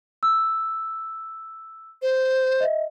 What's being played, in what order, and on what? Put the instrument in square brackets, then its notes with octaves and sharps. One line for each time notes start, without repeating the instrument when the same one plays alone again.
[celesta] E6
[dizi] C5
[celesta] D#5 E5